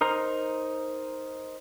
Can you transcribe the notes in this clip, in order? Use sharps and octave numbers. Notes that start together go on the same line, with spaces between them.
D#4 A#4 C5 A#5